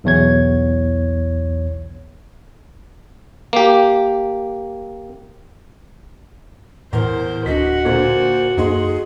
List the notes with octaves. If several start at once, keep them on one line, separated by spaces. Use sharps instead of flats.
B1 E2 C#5 G#6
A#3 G4
E2 A2 A#4 C5
D1 D4 F#4 D#5 F#5 B6
A#2 D3 C5
F#2 A#3 C#4 D#4 G#4 D#5 C6